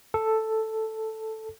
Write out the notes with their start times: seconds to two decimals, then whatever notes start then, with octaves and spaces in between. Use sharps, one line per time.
0.14 A4